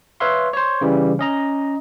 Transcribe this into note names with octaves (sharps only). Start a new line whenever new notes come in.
B4 C#5 E5 F5 C6
C5 C#5
C#3 E3 G3
C#4 D#5 A#5